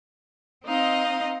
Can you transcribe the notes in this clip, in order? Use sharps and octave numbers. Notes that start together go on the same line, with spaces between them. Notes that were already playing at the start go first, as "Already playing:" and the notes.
C4 D#4 D#5 F5